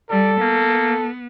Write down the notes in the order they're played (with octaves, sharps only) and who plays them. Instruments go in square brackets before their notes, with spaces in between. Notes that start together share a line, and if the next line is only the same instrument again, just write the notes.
[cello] G3 [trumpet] A4 [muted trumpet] D5
[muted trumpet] A#3 [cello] B3